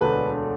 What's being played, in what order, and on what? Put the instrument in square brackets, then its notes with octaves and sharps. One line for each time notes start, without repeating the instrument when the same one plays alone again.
[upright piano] E1 D2 D3 B4